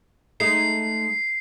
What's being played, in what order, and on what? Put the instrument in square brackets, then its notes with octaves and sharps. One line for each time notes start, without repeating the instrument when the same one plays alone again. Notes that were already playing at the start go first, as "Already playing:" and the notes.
[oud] G#3 A3 D#4 [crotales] C7